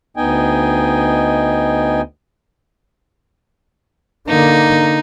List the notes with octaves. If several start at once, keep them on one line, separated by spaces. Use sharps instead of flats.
D2 B3 D#4 D#5 G5 G#5
D3 A#3 D#4